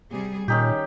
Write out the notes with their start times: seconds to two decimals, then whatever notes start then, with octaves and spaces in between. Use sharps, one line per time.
0.11 C3 G3 G#4
0.48 A#2 D#3 C#4 D#4 G4